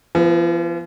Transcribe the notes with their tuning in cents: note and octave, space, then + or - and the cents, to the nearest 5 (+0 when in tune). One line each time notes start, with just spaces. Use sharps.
F3 -40 B3 +0